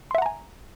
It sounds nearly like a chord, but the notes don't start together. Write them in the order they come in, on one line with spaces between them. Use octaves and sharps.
C6 E5 F#5 A#5 G#5